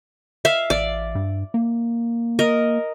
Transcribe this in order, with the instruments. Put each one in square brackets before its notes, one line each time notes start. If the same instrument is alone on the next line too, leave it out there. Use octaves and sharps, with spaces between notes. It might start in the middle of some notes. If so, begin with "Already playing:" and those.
[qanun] E5 F5
[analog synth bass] A1 [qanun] D5
[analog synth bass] G2
A#3
[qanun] A#4 D#5